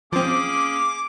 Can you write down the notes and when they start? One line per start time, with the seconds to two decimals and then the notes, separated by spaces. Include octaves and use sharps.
0.12 F3 A#3 C4 C#4 G#4 D6